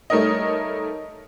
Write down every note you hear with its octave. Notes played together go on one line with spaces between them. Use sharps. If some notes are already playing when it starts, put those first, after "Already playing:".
G3 A3 D#4 A#4 C#5 D#5